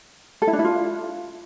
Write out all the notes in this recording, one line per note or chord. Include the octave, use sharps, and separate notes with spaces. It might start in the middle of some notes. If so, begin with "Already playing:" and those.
A4
E4
D4
E4
F4